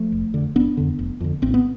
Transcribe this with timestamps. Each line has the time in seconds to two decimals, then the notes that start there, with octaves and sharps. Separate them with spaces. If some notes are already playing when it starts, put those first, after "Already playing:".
Already playing: F3 A3
0.12 F1
0.34 F2 D3
0.56 F1 B3 D4
0.77 F2 D3
0.99 F1
1.21 F2 D3
1.42 A1 C4
1.54 B3